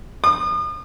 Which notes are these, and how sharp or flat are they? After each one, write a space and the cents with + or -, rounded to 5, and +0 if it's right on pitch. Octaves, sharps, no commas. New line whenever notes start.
D#6 -40